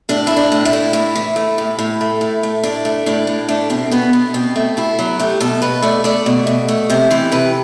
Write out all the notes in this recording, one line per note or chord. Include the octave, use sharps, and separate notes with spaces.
A2 D4
A2 E4
D4
A2
E4
A2
A2
E3
A3
A2
A2
A3
A2
A3
A2 D4
A3
A2 D4
A2
A3 D4
B2 C4
B2 B3
B2 B3
B2 C4
A3
B2 E4
F#3
A3 G4
B2 A4
B2 B4
A3 D5
A3 D5
B2
B2
A3
C3 C5
E3 C5
C3 B4